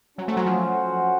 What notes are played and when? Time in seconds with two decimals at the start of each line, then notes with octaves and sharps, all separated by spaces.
0.18 F#3 C#4 F#4 C5 F#5
0.28 A3
0.37 F#3
0.46 F3